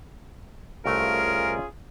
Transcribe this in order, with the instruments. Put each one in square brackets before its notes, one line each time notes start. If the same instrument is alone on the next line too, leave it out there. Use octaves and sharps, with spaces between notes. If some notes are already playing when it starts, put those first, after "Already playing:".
[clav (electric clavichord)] C2 A3 F5 [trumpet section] C#4 F4 G#4 [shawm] A#4